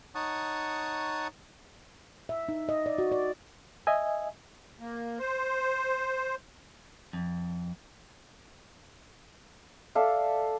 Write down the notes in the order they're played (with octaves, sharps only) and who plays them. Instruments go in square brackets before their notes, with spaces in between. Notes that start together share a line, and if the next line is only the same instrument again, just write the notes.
[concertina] D#4 C#5 F#5 A5 C#6 D#6
[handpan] E5
D#4
D#5
D5
F#4
D5
[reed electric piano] D#5 E5 G#5
[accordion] A#3
C5
[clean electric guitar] F2
[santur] A4 D5 E5 F5